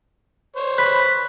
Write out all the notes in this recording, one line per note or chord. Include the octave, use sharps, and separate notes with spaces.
C5 C#5
B4